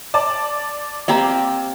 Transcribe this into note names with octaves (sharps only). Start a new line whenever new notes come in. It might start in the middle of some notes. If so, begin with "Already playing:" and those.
D5 A5
A#3 C4 G4 D#5 A#5